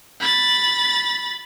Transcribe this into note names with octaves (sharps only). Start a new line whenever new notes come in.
B5 A6